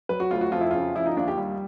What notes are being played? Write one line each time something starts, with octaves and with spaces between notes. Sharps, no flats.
F#3 B4
F#4
D2 F4
F#4
F2 F4
E4
C#3 F4
F3 E4
D#4
D#2 D4
G4
G3